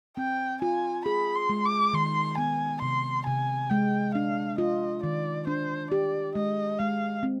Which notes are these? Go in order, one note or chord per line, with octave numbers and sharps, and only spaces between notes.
C4 G5
F4 G#5
G#4 B5
C6
G#3
D6
D#3 C6
B3 G#5
C3 C6
C3 G#5
G#3 G5
D4 F5
F4 D#5
D#3 D5
D4 C5
G4 D5
G#3 D#5
G#3 F5
C4